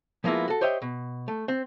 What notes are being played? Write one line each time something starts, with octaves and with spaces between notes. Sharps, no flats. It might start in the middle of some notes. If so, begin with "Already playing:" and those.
F3 G#3 A#3 B3 E4 F4
F#4 A4
G4 C5 C#5 D#5 E5 G5
B2
A3
C4